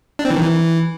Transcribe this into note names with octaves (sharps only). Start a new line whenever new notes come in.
D4
C4
E3
D#3
E3